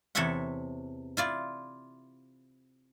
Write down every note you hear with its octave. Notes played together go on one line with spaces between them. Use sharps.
E2 C3 A4 C#5 E5 F#5
E4 F4 D5